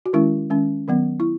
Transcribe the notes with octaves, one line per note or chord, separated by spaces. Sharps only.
F#4
D#3 G#3 C#4 E4
D#3 G#3 C#4
D#3 F#3 B3
E4